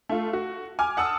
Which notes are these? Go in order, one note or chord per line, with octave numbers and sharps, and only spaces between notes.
A3 F4
F#4
G#5 D6 F6
F#5 A5 D#6 E6